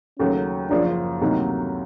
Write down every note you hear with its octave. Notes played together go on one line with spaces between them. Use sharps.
D#2 C#3 F#3 A3 C#4
F#1 F#2 C#3 F3 D4
D2 C3 D#3 F#3 A#3 D#4